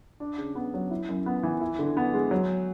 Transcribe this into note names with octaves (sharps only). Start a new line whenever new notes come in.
D4
C#3
B3
F#3
E4
F#2
B3
E3
E4
D3
B3
G#3
F#3